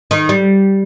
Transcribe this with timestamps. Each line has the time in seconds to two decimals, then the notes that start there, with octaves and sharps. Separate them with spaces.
0.11 D#3
0.29 G3